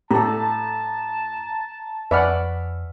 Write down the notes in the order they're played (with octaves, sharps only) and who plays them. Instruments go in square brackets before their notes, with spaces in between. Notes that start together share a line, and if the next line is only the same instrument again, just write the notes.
[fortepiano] A2 A3 [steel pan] G4 A4 [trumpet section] A5 [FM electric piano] A#5
[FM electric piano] F2 [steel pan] B4 D5 F#5 [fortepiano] E5 G#5 F6